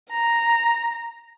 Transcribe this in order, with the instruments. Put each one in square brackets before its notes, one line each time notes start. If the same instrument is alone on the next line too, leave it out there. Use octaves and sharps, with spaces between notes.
[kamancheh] A#5